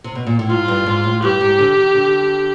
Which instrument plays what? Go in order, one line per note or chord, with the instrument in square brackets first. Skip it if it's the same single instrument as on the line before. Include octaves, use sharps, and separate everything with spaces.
[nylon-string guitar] C3
B2
A#2
A2
[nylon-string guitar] G#2 [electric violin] F4
[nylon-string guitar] G2
G#2
A2
[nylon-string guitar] G2 [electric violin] G4
[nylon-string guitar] G#2
D3
D#3
D3